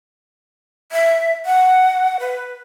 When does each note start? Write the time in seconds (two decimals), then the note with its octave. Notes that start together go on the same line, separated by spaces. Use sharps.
0.92 E5
1.46 F#5
2.20 B4